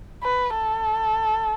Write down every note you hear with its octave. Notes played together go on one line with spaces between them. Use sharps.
B4
A4